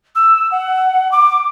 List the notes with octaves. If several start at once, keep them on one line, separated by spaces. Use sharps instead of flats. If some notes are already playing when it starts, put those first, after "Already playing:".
E6
F#5
D6